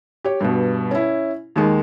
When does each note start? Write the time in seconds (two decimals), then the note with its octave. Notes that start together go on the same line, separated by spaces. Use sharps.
0.24 G4 C#5
0.41 G2 B2
0.91 C#4 E4
1.56 D#2 D#3 G#3